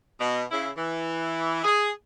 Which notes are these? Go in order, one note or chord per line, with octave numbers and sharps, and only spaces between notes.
B2
C#3 E4
E3
G#4